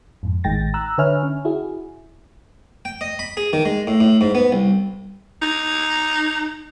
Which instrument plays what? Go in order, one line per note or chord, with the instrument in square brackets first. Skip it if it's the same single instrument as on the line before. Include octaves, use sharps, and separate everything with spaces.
[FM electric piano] F2 G#2
A1 D#3 G#3 G5 A6 A#6
A#5 E6 F#6
D3 B4 C#5 E5 G#5 F6
C#4
E4 F#4 G#4
[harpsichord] G5
D#5
B5
G#4
D#3
G#3
A2
A2
G#2
B3
C2
[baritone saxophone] D#4